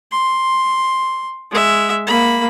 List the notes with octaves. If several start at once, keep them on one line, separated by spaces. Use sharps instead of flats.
C6
G#3 E5
A#3 B5